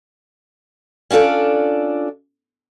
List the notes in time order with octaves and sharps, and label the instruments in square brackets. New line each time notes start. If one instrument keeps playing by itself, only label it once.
[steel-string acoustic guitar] C#4 D4 F4 A4 D5